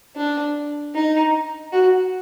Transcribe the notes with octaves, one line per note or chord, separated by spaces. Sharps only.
D4
D#4
F#4